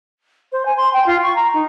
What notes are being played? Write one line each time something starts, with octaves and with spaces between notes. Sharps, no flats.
C5
G#5
C6
G5
F4
C#6
A#5
D#4